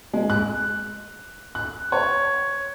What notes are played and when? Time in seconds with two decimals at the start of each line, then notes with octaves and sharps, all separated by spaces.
0.13 G#3
0.30 F#6
1.55 F#6
1.92 C#5